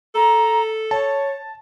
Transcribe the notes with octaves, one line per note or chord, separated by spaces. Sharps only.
A4 A#5
C#5 A5